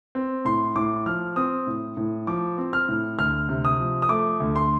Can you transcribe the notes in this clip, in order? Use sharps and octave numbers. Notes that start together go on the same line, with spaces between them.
C4
A2 C6
A2 D6
F3 F6
C4 D#6
A2
A2
F3 D6
C4
F6
A2
D2 F6
C3
D#6
F3
D#6
A3 D6
D2
C6